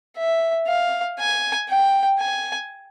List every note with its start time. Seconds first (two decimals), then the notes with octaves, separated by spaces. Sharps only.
0.18 E5
0.68 F5
1.19 G#5
1.69 G5
2.19 G#5